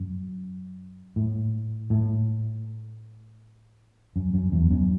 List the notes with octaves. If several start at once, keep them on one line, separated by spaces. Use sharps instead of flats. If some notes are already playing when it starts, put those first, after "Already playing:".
Already playing: F#2
A2
A2
F#2
F#2
E2
F#2